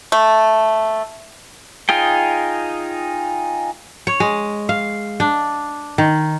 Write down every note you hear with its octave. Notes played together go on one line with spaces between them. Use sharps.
A3
D#4 F4 G#4 G5
C#5
G#3
F5
D4
D#3